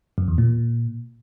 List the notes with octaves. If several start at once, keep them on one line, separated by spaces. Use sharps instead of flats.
F#2
E2
A#2